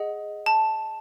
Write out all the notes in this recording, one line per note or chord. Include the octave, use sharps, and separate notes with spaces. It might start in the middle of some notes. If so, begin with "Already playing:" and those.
Already playing: G#4 D#5 F#5
A5